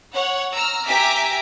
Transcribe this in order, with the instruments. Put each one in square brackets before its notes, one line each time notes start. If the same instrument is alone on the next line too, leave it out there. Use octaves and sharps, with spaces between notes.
[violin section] C#5 F#5
A#5 E6 F6
G4 E5 G#5 A#5 D6 B6